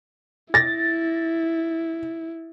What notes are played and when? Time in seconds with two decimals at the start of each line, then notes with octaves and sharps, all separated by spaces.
0.54 E4 A6 A#6